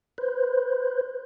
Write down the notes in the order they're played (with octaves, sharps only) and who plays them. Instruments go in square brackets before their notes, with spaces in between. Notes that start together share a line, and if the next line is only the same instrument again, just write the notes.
[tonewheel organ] B4 C5